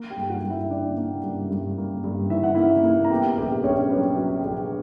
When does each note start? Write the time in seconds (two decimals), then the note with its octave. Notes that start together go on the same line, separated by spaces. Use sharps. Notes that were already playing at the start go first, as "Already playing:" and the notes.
Already playing: A#3
0.10 G4 G5
0.16 G2
0.30 F#4 F#5
0.43 G2
0.50 E4 E5
0.70 A#3 D4 D5
0.97 A#3
1.23 G2
1.50 G2
1.78 A#3
2.04 G2
2.30 E3 E5
2.43 F#5
2.55 A#3 E4 E5
2.84 A#3
3.05 A#5
3.10 B3 G4 G5
3.38 A#1 G4 G5
3.64 A#1 C#4 C#5
3.90 F#3 B4
4.18 F#3
4.44 A#1